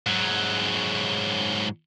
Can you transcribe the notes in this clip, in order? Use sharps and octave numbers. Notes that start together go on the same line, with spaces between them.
G#2 F#3